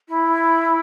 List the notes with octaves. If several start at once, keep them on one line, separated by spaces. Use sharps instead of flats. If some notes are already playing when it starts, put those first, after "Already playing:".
E4